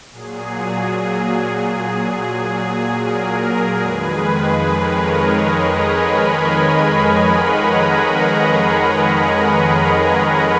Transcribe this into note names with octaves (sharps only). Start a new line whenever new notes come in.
A#2 F#3 G#4
G#4
G#4
A#4
G#4
F2 D#3 G#3 G#4 B4
A#4 C#5
B4 D#5
B4 D#5
G#5 B5
G#5 B5
G#5 B5
F#5 A#5